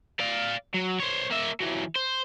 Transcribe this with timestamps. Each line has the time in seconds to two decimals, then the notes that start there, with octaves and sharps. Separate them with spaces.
0.20 D5 F5
0.74 F#3
1.00 C5 C#5
1.31 A#3 E5
1.60 E3 F#3
1.95 C5